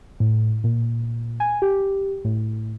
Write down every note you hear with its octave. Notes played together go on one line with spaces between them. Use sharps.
A2
A#2
G#5
G4
A2